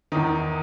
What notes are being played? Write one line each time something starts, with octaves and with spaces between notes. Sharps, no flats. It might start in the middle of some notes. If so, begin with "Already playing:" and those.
E2 D#3 D#4